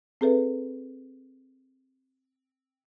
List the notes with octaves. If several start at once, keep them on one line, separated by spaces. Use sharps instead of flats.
C4 G#4 A4 B4 E5